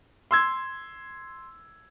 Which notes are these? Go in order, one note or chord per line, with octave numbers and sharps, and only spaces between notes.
C6 E6 G#6